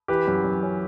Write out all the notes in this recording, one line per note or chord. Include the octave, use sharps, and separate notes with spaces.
E3 G4 B4
F#2
F#2
C#4